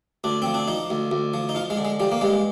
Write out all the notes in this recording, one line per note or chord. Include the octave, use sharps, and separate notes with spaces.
D2 D4
F3 C4
D4
F3 D#4
D2
D2
F3
D#4
F3 F4
G#3
D3
G#3
F3 G3
A#3
G2 G#3